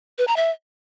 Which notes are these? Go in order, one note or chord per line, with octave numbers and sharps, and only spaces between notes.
B4
A#5
E5